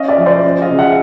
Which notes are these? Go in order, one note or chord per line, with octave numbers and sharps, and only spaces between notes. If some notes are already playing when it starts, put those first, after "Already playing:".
Already playing: C#4 D#5 F5
D5 E5
F3
C5 D5
C#4
D#5 F5
C#3
E5 F#5